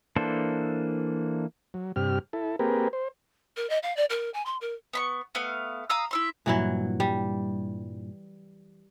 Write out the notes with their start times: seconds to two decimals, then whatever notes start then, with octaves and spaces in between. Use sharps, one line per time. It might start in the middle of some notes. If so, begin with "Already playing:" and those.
0.16 E3 A#3 D4 A4 C5
1.74 F#3
1.96 G2 C3 G4 F6
2.33 E4 A4
2.59 A#3 C4 G4 G#4 A#4 B4
2.93 C5
3.57 A#4
3.70 D#5
3.83 F5
3.97 D5
4.10 A#4
4.34 G#5
4.46 C6
4.61 A#4
4.93 B3 B5 C#6
5.35 A3 B3 F5
5.90 F5 A#5 D#6 E6
6.11 E4 E5 C6
6.46 G2 A#2 E3 F#3 E4
7.00 G3